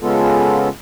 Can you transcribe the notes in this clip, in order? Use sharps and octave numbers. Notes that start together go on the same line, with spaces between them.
C#3 G#3 B3 C#4 F4 A4